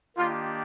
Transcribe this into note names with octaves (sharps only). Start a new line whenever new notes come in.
D#3 A#3 D4 F4 G4 D5